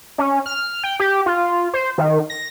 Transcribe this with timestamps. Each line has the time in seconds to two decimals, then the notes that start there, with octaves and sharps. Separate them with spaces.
0.18 C#4
0.46 F6
0.84 G5
1.00 G4
1.26 F4
1.74 C5
1.98 D#3
2.30 A#6